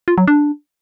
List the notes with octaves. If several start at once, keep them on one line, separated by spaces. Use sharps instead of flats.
F4
F#3
D4